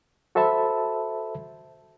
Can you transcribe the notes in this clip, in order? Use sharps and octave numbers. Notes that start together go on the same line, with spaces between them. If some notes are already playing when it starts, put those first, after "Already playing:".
F#4 A4 C5 E5 A5 B5